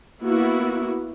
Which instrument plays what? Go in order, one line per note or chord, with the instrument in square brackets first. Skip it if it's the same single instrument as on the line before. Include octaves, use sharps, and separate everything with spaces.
[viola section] A#3 B3 E4 F#4